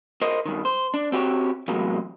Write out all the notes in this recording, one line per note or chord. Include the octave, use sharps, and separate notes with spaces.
A#4 C5 D#5
G2 D#3
C5
D4
C4 F#4 G4 C#5
A2 C3 E3 F#3 G#3 A#3